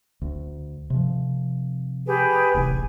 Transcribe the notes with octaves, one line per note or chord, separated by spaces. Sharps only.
D2
C3 F3
G4 G#4 B4
D1 A1 C3 G#5